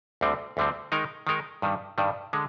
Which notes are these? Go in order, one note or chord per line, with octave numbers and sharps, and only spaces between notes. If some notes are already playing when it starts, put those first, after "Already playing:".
D2 D3 G3 C4
D2 D3 G3 C4
D#3 G#3 D#4 A#4
D#3 G#3 D#4 A#4
G2 D#3 G3
G2 D#3 G3
D3 G#3